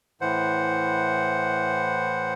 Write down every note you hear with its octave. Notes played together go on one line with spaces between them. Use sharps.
A2 E3 C5 F#5